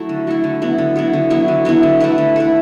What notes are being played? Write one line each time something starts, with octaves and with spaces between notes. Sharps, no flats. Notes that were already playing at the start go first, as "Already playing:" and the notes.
Already playing: F#3 A3 E4
D3
F#3 A3 E4
D3
F#3 B3 E4
D3
F#3 B3 E4
D3
F#3 B3 E4
D3
F#3 B3 E4
D3
A3 E4 B4
D3
A3 E4 B4